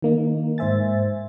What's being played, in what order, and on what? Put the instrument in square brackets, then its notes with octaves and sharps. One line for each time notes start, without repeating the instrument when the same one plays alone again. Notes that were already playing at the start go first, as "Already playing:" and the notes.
[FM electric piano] D#3 A#3 D#4
G#2 C5 E5 G#5 A6